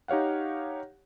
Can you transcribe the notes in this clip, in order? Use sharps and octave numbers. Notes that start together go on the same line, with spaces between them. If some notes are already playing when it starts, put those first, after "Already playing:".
D#4 G4 C#5 F5 F#5